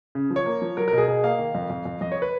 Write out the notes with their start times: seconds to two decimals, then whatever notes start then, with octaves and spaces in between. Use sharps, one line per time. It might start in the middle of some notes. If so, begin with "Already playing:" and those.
0.15 C#3
0.30 F3
0.36 C#5
0.46 A#3
0.62 F3
0.77 F#3 A#4
0.88 A#4
0.93 B2 G#4
1.08 B2 G#4
1.24 A#3 F5
1.39 D#3
1.55 F2
1.70 F2
1.85 F2
2.01 F2 D#5
2.12 C#5
2.22 B4